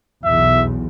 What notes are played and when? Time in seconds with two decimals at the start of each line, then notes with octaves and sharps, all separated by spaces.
0.25 B1 E2 E5